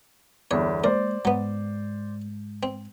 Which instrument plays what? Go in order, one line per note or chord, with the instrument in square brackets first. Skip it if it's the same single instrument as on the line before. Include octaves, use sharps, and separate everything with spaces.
[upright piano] G1 E2 [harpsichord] C#5
[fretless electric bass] G#3 A#3 [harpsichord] A#4 [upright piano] C5 D5
[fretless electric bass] G#2 G#3 [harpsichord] F#3 B3
[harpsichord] C4